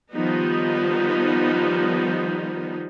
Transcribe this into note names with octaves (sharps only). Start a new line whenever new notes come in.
D#3 F3 G3 B3 D#4